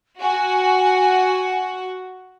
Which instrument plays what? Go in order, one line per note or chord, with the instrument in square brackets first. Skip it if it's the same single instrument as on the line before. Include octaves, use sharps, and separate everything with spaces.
[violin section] F#4 [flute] G#5